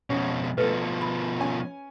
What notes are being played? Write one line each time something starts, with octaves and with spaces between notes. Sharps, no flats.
F2 B2 C#4
B2 F3 A3 A4 B4
B5
C#4 G#5